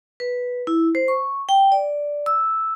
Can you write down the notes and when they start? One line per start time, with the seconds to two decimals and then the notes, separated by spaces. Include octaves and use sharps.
0.20 B4
0.67 E4
0.95 C5
1.08 C#6
1.49 G5
1.72 D5
2.26 E6